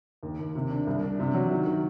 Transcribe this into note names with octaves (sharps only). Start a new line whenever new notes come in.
D#2
D#2
C3
D4
C2
D4
C3
F#3
D#3
D#3